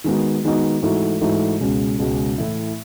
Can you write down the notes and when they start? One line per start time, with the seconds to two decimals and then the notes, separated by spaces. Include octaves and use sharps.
0.04 D#3 G#3 B3 D#4 F#4
0.44 D#3 G#3 B3 D#4 F#4
0.82 G#2 E3 A3 D#4 F#4
1.21 G#2 E3 A3 D#4 F#4
1.60 C#2 B2 G#3 C#4
1.99 C#2 B2 G#3 C#4
2.38 A2 E3 A3 E4